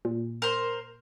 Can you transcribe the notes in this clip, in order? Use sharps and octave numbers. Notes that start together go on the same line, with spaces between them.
A#2
A#4 C5